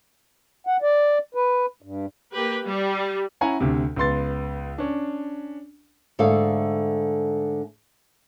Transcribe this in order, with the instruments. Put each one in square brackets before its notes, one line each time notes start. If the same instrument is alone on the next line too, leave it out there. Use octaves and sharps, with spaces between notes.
[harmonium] F#5
D5
B4
G2
[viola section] A#3 G4 B4
G3
[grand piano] C#4 E4 F#5 G#5 A#5
D2 C3
C#2 B3 C6 A6
C#4 D4
[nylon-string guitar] G#2 D3 A3 A4 D5 F5